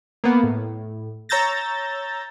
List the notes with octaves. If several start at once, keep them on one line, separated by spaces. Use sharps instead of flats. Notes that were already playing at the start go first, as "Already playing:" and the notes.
A#3 B3
A2
C#5 A#5 E6 G6 A6 A#6